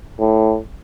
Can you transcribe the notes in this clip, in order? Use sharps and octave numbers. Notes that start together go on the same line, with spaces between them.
A2